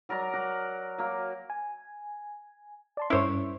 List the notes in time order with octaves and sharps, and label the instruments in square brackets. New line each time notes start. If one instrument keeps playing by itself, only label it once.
[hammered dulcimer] F#3 A#4 D5 A#5
A#4 F#5 D6
F#3 A#3 A#4
[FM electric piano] G#5
D5 A5 C6
[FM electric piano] G2 C#4 [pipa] E4 C5 C#5